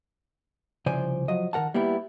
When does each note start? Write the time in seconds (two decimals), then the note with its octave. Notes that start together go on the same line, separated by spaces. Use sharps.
0.86 C2 C#3 F3 C5 D5 G#5
1.28 F3 F#3 D#5
1.53 D#3 E3 A#4 F#5 A5
1.74 G3 A#3 B3 E4 G4